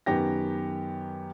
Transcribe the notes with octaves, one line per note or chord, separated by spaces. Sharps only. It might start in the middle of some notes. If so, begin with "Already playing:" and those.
F#2 D#3 B3 G4 A#6